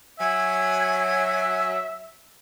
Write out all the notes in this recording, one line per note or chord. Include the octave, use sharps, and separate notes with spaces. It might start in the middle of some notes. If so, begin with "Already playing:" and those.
F#3 E5 G#5